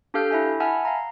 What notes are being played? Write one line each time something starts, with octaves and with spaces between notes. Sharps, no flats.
D4 G4 A4 F5 F6 G6
E4 E5 G#5
E5 F#5 G#5 A5 B5 F6
F5 A#5